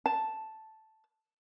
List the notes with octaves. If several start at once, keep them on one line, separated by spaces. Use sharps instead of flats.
A5